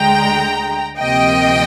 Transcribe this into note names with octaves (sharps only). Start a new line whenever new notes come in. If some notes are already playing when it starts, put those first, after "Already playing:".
Already playing: D2 D3 G#3 G5 A#5
D2 C3 F3 A#3 D#5 G5